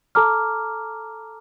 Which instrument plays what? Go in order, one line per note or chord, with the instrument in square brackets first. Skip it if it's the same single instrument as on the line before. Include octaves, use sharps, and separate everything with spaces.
[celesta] A4 A5 A#5 D6 F6